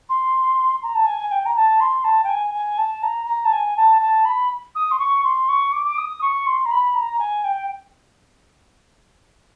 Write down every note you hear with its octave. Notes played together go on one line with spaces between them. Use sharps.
C6
A#5
A5
G#5
G#5
G5
A#5
A5
C6
A5
G5
G#5
G#5
A5
A#5
A#5
A5
G#5
A5
A5
B5
D#6
C6
C#6
C6
C#6
D6
D6
D#6
C#6
C6
A#5
B5
A#5
G#5
G5